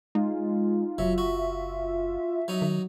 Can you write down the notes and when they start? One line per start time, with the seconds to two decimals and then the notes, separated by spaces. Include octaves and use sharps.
0.15 G#3 D#4 F4
0.98 F#1 F#3 E5
1.18 F#4
2.48 F#3 D#4
2.62 D#3